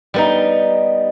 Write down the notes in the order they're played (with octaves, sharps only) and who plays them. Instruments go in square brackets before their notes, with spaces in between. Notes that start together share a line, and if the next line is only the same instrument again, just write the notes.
[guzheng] G3 B3 D#4